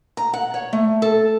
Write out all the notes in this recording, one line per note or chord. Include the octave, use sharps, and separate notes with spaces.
A#5
F#5
C#5
A3
A4